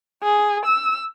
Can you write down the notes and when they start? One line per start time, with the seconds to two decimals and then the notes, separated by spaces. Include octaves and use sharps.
0.23 G#4
0.65 E6